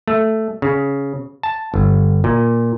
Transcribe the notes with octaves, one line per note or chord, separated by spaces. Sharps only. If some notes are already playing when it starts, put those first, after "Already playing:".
A3
C#3
A5
G1
A#2